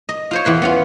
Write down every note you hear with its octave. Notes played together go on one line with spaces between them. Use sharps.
D#5
F4 C5 C#5
E2 E3 B4 C6
B3 C#4 F4